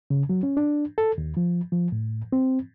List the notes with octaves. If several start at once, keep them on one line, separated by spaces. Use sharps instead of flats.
C#3
F#3
C#4
D4
A4
D#2
F3
F3
A2
C4